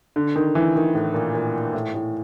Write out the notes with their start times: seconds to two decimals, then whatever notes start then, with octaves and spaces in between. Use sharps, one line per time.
0.16 D3
0.36 D#3
0.55 E3
0.75 D#3
0.95 A2
1.14 A#2
1.35 A#2
1.74 A2
1.94 A2